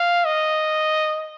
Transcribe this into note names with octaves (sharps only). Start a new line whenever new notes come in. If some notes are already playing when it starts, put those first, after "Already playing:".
Already playing: F5
D#5